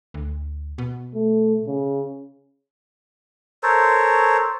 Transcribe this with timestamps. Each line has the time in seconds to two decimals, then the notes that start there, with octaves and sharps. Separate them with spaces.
0.14 D2
0.78 B2
1.15 A3
1.67 C#3
3.63 A4 A#4 C5 C#5